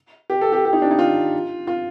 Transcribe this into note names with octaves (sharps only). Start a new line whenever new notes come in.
G4
A4
G4
G4
D#4
D4
D#4
F4
F4